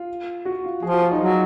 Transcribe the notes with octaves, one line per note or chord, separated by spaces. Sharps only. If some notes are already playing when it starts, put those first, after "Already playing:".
Already playing: F4
F#4
F4
F3 G#4
F#4
F4
D#4
F#3